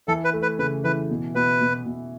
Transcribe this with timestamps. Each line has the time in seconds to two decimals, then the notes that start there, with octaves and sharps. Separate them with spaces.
0.08 E3 A4
0.25 B4
0.34 A3
0.42 B4
0.59 C#3 B4
0.84 E3 B4
1.10 B2
1.35 B2 B4
1.61 B2
1.86 B2